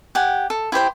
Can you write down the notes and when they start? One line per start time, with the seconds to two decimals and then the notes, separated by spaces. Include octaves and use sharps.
0.15 G4 F#5 G#5
0.50 A4
0.72 E4 G4 C5 G5